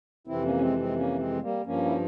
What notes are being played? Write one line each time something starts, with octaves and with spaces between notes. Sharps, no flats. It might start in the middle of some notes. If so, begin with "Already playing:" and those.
F2 C3 E3 C4 E4
A#3 C#4
C#4
G#3 C4
G#3 C4
A#3 C#4
G#3 C4
G3 A#3
G2 F3 A#3 C#4
E4